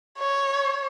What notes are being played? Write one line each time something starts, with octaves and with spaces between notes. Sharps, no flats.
C#5